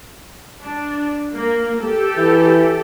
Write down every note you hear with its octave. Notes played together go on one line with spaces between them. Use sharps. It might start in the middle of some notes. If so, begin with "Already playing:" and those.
D4
A#3
G4 A4
E3